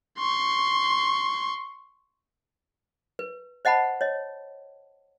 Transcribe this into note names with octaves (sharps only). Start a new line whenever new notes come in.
C6 C#6
B4
C5 D#5 F#5 A5 B5
C#5 D#5